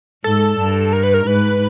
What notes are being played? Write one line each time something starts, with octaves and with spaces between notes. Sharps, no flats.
G#2 A4
G2
A#4
B4
A#4
G#2 B4